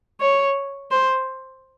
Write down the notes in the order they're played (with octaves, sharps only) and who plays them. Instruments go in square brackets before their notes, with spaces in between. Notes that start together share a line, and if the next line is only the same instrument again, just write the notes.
[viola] C#5
C5